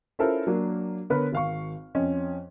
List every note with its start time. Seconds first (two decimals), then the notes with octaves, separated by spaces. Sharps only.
0.19 C#4 E4 F4 A4 A#4 C5
0.47 F#3 A#3 D4
1.10 D3 B3 A#4 B4 C#5
1.32 G#1 F5 C#6
1.95 F2 C#4 D#5